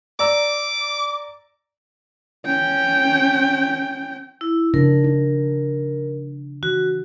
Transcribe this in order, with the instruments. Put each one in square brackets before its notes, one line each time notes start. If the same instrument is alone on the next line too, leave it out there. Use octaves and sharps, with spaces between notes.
[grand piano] D5 A#5 E6 [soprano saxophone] D6
[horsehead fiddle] C#4 G5
[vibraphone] E4
[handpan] C#3 F3 D4 [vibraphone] A#4
[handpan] D#4
[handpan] E3 [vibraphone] F#4